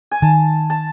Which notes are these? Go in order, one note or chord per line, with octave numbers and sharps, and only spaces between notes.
G#5
D#3 A5
A5